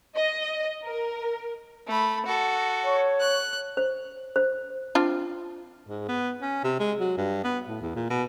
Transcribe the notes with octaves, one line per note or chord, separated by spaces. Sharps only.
D#5
A#4
A3 B5
F#4 A4
C#5
F#6
C5
C5
C4 D4 F4
G#2
B3
C#4
C3
G#3
F#3
G2
B3
A2
E2
A#2
B2